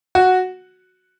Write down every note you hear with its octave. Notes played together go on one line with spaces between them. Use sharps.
F#4